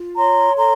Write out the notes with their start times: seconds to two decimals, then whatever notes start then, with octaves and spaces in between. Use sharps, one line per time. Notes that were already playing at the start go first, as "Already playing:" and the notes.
Already playing: F4
0.17 C#5 A#5 C6
0.57 A4 A#5 C6